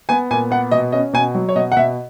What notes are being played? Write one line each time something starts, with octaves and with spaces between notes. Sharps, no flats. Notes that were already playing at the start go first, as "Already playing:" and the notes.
B3 G#5
A#2 G#5
B3 F#5
B2 D#5
C#4 D#5
B2 G#5
F#3
C#5
B2 D#5
F#5
B2 E5